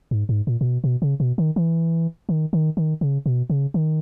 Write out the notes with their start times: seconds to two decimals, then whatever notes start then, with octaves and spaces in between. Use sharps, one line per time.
0.11 G#2
0.29 G#2
0.47 A#2
0.61 A#2
0.65 B2
0.84 B2
1.02 C#3
1.20 B2
1.38 D#3
1.56 E3
2.29 D#3
2.53 D#3
2.77 D#3
3.01 C#3
3.26 B2
3.50 C#3
3.74 D#3